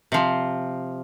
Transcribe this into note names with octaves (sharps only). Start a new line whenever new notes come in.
C3 F3